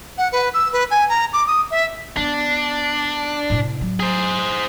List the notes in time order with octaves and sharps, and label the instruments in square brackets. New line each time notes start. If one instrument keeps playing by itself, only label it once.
[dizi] F#5
B4
E6
B4
G#5
A#5
D6
D#6
E5
[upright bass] B3 [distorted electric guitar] D4
[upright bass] A2 C3
F#3
[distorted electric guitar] G#4 C5